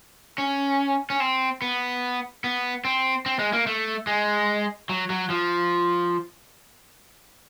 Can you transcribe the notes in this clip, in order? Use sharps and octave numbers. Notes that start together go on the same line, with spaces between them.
C#4
C#4
C4
B3
B3
C4
C4
G#3
A#3
A3
G#3
F#3
F#3
F3